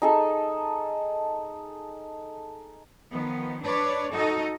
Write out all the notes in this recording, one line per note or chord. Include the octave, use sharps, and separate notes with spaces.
D#4 G#4 A4
D#3 F3 B3
D4 B4 C#5 D5
D#4 F#4 A4 D#5